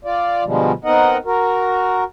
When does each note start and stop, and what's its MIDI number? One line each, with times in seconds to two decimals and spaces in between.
0.05 0.44 65
0.05 0.44 74
0.44 0.72 47
0.44 0.72 50
0.44 0.72 53
0.44 0.72 55
0.44 0.72 56
0.85 1.17 59
0.85 1.17 60
0.85 1.17 63
0.85 1.17 70
0.85 1.17 75
0.85 1.17 78
1.25 2.04 66
1.25 2.04 70